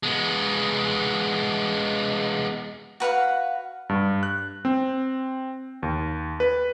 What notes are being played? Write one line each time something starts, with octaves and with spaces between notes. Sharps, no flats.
G#3 B3
F#4 B4 F5 F#5
G2
F#6
C4
D#2
B4